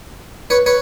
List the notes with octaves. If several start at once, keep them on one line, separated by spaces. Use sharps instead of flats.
B4 C#5
B4 C#5